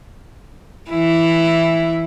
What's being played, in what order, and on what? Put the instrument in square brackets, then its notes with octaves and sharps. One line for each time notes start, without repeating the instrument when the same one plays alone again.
[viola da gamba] E3 E4